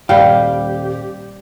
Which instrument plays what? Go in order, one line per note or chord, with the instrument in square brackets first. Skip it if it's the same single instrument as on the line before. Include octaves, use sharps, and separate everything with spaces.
[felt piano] D#1 [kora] G3 [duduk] G4 [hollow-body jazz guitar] F5 G5